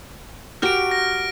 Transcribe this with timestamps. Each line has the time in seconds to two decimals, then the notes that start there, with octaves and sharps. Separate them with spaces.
0.62 F#4 G4 A#4 F6 D7
0.91 A#6